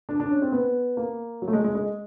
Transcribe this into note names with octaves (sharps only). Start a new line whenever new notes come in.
D4
D4
C#4
C4
B3
A#3
F#3
A3
G#3
G#3
G#3